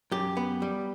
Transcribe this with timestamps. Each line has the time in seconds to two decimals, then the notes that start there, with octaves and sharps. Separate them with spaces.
0.11 F#2 G4
0.37 B3
0.62 G3